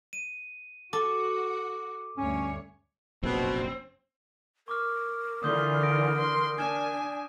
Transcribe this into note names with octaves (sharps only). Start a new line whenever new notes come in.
D#7
F#4 A4 D6
D2 G2 C#4 C#5
F1 A#1 F#2 B2 C4
A#4 C#6 D6 F6
D3 E3 F4 D#6 G6 G7
D#6 A#6 D7
C6
D4 G#5 G#6 E7